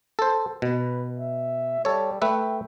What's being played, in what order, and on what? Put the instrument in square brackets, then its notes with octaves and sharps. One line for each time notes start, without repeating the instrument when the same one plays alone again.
[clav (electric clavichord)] A4 C5
[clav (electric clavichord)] B2 [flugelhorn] B4
[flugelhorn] E5
[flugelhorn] G3 [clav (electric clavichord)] A4 C#5
[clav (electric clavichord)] A3 B4 E5 [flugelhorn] G5